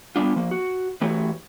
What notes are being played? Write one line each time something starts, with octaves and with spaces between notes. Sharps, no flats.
G3 B3 D4 F4
F3 A#3
F#4
E3 A3 F#4 G4 C#5